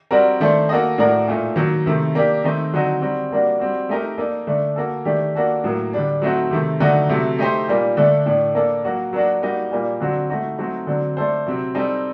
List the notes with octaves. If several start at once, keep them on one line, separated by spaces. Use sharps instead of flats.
G3 C4 F#4 A#4 D5
D#3 A3 D4 A4 C5
A#3 F#4 A4 D#5
A2 A3 D4 F#4 A#4
A#2 A3 D#4
D#3 F#3 A#3
C3 D#3 A3
A#3 D4 G4
D#3 A3 C4 D#4
D3 F#3 C4 D#4 F#4
G3 C4 F#4
G3 A#3 D4 F#4
G3 C4 F#4
A3 D#4 G4 A#4
A#3 D#4 A4 D5
D3 A3 D4
A#3 F#4 A4
D#3 A3 D4 G4
A#3 D4 F#4 A4
A2 F#3 A#3
D3 G3 D4
F#3 A3 C4 D#4 F#4
C3 D#3 A3
D3 F#3 A3 D#4 F#4
C3 F#3 A3
A3 D#4 G4 C5
A#2 G3 A#3 D#4
D3 A3 D4 A4
A2 A3 D4
A#3 D4 A4
F#3 A#3 F#4
F#3 A#3 D4 F#4
G3 A#3 D#4 F#4
A#2 G3 A#3
D3 F#3 C4 F#4
A3 D#4 F#4
F#3 A3 C4 D#4 F#4
D3 F#3 C4
A3 D4 A4 C5
C3 F#3 C4
G3 C4 D#4 A4